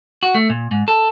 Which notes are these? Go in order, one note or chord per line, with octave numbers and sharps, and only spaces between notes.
F#4
A3
A#2
G#2
A4